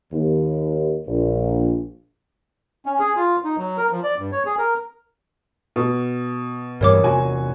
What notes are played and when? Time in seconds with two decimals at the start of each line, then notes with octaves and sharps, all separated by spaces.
0.12 D#2
1.07 A#1
2.86 C#4
2.99 G#4
3.16 F4
3.44 D#4
3.57 F#3
3.77 A#4
3.92 F3
4.03 D5
4.18 G2
4.32 C#5
4.46 G#4
4.58 A#4
5.76 B2
6.81 G2 E3 G3 A#4 C#5 D6
7.04 E2 C3 F#4 G#5